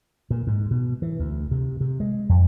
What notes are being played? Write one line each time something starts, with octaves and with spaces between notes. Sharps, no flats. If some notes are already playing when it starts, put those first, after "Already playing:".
A#2
G#2
B2
E3
D2
C3
C3
G#3
F2